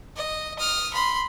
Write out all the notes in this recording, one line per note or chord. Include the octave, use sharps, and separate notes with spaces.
D#5
D#6 F6
B5 C6